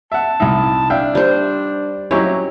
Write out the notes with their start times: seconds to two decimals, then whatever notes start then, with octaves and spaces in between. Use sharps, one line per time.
0.12 E5 F#5 A5
0.40 C2 D#4 E5
0.90 D4 E5 F5 G5
1.15 G3 C5
2.11 F#3 C#4 D#4 E4 G4 C#5